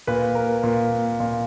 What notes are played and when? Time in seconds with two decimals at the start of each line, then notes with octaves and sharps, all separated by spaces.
0.07 A#2 B4
0.35 A#4
0.63 A#2
1.20 A#2